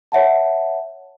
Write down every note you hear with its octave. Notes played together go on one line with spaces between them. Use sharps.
C#5 E5 F#5 A5